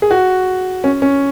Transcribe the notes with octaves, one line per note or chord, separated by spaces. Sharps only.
G#4
F#4
C#4
C#4